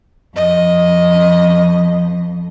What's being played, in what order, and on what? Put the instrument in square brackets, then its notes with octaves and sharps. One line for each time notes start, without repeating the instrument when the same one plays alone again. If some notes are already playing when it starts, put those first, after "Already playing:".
[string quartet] F2 [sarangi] D#5